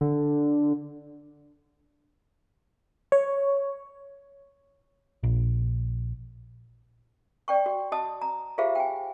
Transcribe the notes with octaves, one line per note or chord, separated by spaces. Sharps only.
D3
C#5
A#1
D5 G5 C#6
F#4
F#4 D#5 A5 D#6
A#5
F4 G4 G#4 C5 E5 F5
G5 G#5